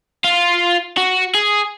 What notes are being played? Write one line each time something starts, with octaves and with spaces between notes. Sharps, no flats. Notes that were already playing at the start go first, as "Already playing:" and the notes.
F4
F#4
G#4